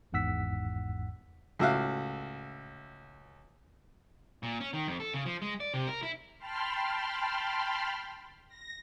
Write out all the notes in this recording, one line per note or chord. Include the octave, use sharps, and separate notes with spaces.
G#1 E2 G#2 F#5 E6 B6
C#2 A2 F#4 E5 F5 F#6
A#2
C#4
D#3
F2
A4
C#3
F3
G#3
D5
C3
A#4
E4
G5 A5 B5 C6 F6
A#6